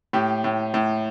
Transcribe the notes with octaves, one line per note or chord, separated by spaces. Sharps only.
A2 G4
A2
A2